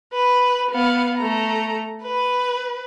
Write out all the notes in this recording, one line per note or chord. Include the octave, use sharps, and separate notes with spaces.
B4
B3 F5
A3 A#5
B4